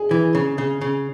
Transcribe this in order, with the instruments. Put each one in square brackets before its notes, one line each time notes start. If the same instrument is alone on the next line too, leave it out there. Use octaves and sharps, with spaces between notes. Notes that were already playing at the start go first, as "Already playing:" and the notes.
Already playing: [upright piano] G#4
[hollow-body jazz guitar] E3
C#3
C#3
C#3